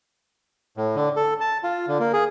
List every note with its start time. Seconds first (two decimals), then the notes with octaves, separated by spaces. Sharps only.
0.77 A2
0.96 D3
1.16 A4
1.41 A5
1.63 F4
1.88 D3
2.00 A#3
2.13 G#4